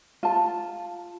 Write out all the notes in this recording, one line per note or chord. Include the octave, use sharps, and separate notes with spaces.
F4 A5